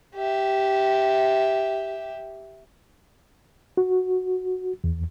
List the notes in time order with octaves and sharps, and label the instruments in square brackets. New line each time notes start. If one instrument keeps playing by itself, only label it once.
[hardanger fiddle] G4 E5
[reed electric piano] F#4
E2